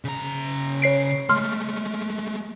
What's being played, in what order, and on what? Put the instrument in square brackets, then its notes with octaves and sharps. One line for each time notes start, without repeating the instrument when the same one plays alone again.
[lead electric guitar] C#3 A#5
[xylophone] C#5 C7 D7
[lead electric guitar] G#3 A3 [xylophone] C6 F6